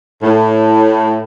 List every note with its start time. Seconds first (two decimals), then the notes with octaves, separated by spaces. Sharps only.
0.23 A2